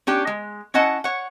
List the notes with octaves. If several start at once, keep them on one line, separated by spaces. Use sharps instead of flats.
C#4 D4 G4
G#3
C#4 E4 D#5 F#5 A5
C#5 F#5